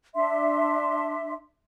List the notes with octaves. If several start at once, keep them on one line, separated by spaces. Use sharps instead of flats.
D4 E5 C6